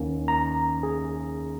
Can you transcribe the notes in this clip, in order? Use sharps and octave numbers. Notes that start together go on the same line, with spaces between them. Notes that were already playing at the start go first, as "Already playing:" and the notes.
Already playing: D#2 D#3 A#3 C#4
A#5
G#4